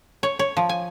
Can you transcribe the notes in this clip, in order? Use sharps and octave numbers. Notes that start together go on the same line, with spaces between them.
C#5
C#5
F3
G#5